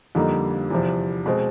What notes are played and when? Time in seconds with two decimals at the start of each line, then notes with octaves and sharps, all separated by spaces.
0.15 F2 D3 G3 A#3 D#4
0.70 E2 C3 F3
1.26 B2 G#3 C4